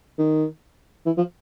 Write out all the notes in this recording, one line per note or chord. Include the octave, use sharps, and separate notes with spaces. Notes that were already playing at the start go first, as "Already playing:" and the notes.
D#3
E3
F3